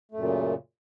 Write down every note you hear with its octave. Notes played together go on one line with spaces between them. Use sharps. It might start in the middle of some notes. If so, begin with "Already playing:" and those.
F#2 A#2 C#3 A3